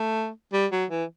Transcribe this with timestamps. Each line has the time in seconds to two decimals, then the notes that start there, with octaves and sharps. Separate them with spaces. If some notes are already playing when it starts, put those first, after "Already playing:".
Already playing: A3
0.53 G3
0.72 F#3
0.91 E3